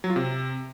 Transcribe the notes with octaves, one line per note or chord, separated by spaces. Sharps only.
F#3
F4
C3